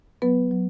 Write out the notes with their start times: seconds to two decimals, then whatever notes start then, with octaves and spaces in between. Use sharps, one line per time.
0.22 F#3 B3 B4
0.51 F#3